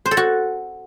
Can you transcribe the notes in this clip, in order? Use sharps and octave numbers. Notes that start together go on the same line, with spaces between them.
C5
A4
F#4